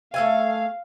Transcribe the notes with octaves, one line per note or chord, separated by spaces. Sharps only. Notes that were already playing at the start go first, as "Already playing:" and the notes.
A3 E5 F5 G#5